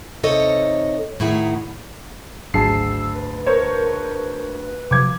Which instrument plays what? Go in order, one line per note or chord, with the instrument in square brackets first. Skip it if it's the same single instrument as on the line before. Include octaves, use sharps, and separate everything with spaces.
[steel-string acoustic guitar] C3 D#4 A4 C#5 D#5
A2 D#3 E4 G#4 F#5 A#5
[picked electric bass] G#1 F#3 [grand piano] D2 G#4 A5 [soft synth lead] E6 [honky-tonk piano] C7
[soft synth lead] B4
[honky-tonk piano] A#4 C5 C#5
[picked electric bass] C3 F3 F#3 [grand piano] D6 G#6